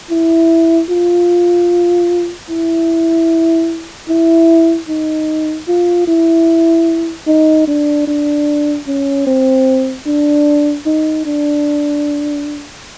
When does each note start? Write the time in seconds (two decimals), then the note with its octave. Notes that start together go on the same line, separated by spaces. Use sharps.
0.10 E4
0.89 F4
2.50 E4
4.09 E4
4.89 D#4
5.68 F4
6.08 E4
7.27 D#4
7.67 D4
8.07 D4
8.87 C#4
9.27 C4
10.06 D4
10.86 D#4
11.26 D4